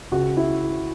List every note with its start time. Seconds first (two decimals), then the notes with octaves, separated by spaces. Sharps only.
0.12 C#2 F#4
0.37 E4